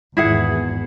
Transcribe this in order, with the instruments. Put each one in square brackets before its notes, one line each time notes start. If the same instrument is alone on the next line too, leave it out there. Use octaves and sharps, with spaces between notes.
[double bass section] G#1 E2 [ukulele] E4 G#4 F#5